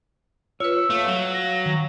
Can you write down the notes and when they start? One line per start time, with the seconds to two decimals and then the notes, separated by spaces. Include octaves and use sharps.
0.60 F4 B4 C#5 E6
0.90 A3 F5
1.06 F#3
1.34 A#6
1.66 D#3